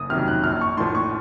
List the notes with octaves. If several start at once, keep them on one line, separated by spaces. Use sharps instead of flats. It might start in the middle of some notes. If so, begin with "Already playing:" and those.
Already playing: F#1 D#6
F2 C3 D#3 F#3 F6
F#6
A#1 F6
C#6
A2 F3 C6
C#6